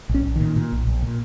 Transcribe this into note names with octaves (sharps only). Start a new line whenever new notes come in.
A#1 C#4
A#1
A#2 D#3
A#2
A#1
A#1
A#2